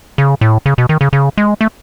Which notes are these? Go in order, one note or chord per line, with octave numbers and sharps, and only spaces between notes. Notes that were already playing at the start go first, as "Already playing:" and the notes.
C#3
A2
C#3
B2
D#3
C#3
C#3
G#3
A3